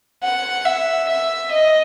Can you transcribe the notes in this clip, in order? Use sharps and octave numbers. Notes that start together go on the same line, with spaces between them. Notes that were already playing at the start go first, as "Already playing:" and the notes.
F#5
E5
E5
D#5